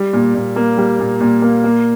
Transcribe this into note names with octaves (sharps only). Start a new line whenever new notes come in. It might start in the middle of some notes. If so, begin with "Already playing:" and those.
Already playing: G3
A#2
A#2
A#3
G3
A#2
A#2
A#3
A#3